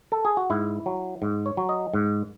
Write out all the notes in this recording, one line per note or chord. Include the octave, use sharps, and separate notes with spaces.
A4
G#4
F#4
G#2 E4
F#3
G#2
C#5
F#3
D#5
G#2